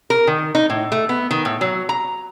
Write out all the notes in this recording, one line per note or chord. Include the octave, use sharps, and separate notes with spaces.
A#4
D#3
D#4
A2
A3
B3
D#3
A2
F#3
A#5